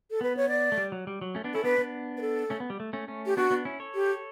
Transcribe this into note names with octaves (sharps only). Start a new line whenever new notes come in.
A4
B3 B4
C#5
D5
A3
G3
F#3
G3
F#3
A3 C#4
B3 D4
C#4 E4 A4
B3 D4 B4
B3 D4
B4
A4
A3 C#4
B3
G3
A3
A3 C#4
A3 C#4
G4
B3 D4 F#4
B3 D4
C#4 E4
A4 C#5
G4